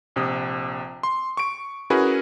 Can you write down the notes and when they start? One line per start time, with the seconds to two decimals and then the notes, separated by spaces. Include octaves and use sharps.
0.16 A#1 C3 D#6
1.03 C6
1.37 C#6 D7
1.90 C#4 E4 F#4 G#4 A#4 B4